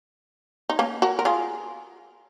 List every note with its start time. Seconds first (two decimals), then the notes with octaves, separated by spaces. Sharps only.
0.69 D#4
0.79 A#3 C#4
1.02 F#4 A#4
1.19 A#4
1.25 F4 G#4